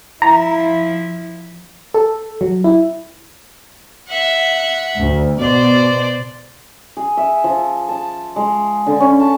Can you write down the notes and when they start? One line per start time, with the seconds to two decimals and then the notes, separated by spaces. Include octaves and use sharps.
0.22 F3 E4 A#5
1.94 A4
2.41 F#3
2.64 E4
4.08 E5 F#5
4.98 D2
5.39 B2 C5 D5
6.97 G#4
7.17 E5
7.44 F3
7.89 A5
8.36 G#3
8.87 D3
9.00 C#4
9.20 A5